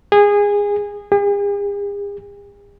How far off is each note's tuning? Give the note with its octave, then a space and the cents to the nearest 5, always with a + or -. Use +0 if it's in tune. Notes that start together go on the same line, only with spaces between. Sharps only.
G#4 -20
G#4 -45